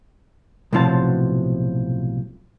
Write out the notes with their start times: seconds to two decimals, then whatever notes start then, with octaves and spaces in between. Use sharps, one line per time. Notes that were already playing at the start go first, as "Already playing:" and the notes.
0.73 B1 A2 C3 F3 F#3 A5